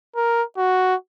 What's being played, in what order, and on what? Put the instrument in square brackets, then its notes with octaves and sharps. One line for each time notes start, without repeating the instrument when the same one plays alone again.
[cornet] A#4
F#4